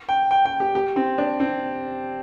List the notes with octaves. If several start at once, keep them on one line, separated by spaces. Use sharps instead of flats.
G5
G5
G5
G4
G4
C4
D4
C4